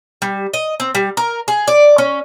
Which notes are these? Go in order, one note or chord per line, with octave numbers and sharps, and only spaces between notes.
G3
D#5
C4
G3
A#4
G#4
D5
C#4